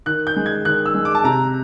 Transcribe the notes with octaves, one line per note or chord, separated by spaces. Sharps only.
D#3 F#6
G6
G#3
G#6
D#3 F#6
E6
G#3
D6
A5
C3 A#5